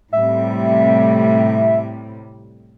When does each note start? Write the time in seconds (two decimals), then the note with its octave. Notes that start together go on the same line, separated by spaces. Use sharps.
0.13 A2 C3 G3 E5